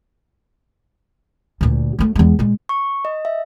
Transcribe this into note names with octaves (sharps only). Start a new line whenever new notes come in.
D2 A#2
F#3 A3
E2 G#3
A#2 G#3
C#6
D#5
E5